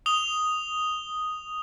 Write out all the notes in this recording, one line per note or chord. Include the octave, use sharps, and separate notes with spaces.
D#6 F7 G7